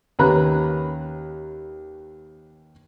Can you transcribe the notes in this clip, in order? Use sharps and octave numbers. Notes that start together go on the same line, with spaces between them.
D#2 C#4 B4 A#5 B5 F#6